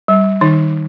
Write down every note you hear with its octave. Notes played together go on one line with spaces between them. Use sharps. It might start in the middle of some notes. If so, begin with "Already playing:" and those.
G3
D#3 D#4